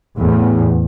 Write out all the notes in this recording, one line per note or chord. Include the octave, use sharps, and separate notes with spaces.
E2 A2